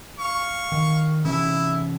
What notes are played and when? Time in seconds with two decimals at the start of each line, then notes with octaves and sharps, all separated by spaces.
0.19 F5 C#6
0.72 D#3
1.24 C3 E3 C#4 E4